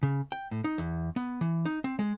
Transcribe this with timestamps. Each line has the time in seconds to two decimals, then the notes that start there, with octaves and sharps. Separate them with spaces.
0.03 C#3
0.32 G5
0.51 A2
0.64 D#4
0.78 E2
1.16 B3
1.41 E3
1.65 D#4
1.84 C4
1.99 G#3